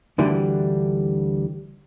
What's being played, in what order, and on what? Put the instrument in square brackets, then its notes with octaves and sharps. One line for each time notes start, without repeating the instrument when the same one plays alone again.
[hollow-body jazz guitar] D2 D3 E3 G3 D4